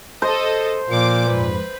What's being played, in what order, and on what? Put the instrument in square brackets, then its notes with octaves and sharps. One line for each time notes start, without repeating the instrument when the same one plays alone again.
[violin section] A4 D#5 [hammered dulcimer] C5
[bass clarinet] A#2 [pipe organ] F3 A#3 [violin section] F5 D6
[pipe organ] F2 G#2 [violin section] B4